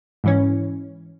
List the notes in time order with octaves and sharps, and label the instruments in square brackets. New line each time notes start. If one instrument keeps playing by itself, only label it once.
[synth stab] G#2 E3 C#4